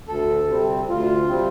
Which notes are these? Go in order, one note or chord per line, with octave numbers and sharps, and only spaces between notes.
D2 A4
C3 G3 C4
D2 F4
C3 G3 C4